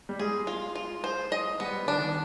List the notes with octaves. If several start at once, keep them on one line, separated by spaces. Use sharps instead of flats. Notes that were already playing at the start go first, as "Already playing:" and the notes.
G3
G#3 G#4
F4
F4
C5
D#5
G3 B3
D3 D4
D#3